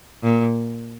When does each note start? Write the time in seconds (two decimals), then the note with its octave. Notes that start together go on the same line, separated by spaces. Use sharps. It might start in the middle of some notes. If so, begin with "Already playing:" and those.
0.23 A#2